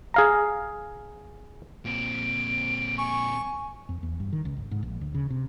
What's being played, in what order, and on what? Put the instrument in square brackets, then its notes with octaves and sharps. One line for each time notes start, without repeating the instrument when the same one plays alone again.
[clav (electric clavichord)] G#4 F5 A#5
[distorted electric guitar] A#2 C4 [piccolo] D7
[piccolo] G#5 [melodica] C#6
[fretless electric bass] F2
E2
G2
D#3
C#2
G#1
G#2
A#1
D2
C#3
C3